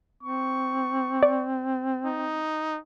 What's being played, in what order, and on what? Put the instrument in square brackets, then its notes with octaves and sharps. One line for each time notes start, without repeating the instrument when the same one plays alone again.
[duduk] C4 [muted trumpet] C#6
[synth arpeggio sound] D5
[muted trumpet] D#4